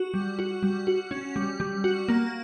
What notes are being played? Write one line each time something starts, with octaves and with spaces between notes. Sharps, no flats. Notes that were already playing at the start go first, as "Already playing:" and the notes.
Already playing: F#4
G3
F#4
G3
F#4
C#4
G3
G3
F#4
A#3